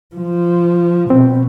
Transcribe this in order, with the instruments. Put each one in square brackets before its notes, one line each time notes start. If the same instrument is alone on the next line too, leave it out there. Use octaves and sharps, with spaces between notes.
[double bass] F3
[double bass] B2 [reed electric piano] C4